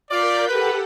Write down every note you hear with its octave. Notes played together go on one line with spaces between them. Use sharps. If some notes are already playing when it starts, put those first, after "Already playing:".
F4 A#4 D5 G6 B6
G4 A4 B4 F#5